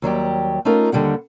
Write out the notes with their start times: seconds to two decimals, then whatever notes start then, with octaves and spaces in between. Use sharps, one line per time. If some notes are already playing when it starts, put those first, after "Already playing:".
0.02 D#2 F#3 G3 G4
0.65 A3 C#4 D#4 F4 A#4
0.92 D#2 D3 G3 G4 F#5